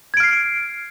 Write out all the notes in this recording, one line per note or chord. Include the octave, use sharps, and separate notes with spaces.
F6 G#6 C7 D7